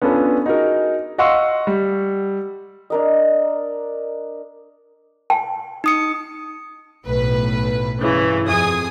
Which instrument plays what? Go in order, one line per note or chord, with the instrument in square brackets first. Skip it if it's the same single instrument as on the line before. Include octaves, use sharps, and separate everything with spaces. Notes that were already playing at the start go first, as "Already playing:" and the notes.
[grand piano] B3 C#4 D4 F4 A4 B4
D#4 F#4 G#4 A#4
D#5 F5 F#5 C6 C#6 E6
G3
[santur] D4 A#4 D#5
[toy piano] G5 A5
[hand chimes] D#4 D#6 C#7
[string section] B1 A2 B4
G2 C#3 E3
F2 G#4 G#5 D#6